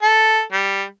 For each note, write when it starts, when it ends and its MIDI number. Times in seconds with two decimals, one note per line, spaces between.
0.03 0.41 69
0.52 0.83 55